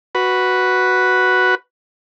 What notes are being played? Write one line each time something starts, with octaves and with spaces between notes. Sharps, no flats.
F#4 B4